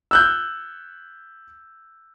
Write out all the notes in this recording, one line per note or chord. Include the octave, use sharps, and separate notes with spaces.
E6 F#6 G6